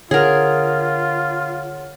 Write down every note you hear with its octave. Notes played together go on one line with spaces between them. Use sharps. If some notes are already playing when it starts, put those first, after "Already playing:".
D3 F4 G#4 A#4 C#5 F#5